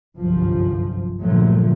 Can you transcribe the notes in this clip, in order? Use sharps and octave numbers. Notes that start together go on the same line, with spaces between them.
G1 C2 F#2 F3
G2 A#2 D3 F3 F#3 A3